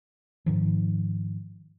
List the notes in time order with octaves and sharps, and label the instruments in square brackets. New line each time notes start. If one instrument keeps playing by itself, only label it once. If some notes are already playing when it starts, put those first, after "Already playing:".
[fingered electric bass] G#2 D#3 F3